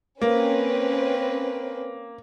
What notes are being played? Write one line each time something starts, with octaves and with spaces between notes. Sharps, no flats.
A#3 C4 C#4 B4